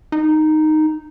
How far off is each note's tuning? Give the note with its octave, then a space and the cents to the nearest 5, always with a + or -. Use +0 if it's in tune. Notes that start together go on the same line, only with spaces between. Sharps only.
D#4 -5